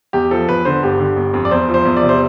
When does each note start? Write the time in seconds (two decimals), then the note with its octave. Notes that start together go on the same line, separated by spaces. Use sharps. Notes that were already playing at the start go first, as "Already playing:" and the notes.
0.13 E2 G4
0.31 F3 A4
0.48 E2 B4
0.65 D3 C5
0.83 G1 G4
0.99 D3
1.16 G1
1.34 F2
1.45 D5
1.51 E2 C5
1.68 F3
1.74 C5
1.85 E2
1.97 D5
2.02 C3
2.09 C5